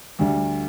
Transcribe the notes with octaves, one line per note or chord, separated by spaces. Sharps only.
D2 D3 G3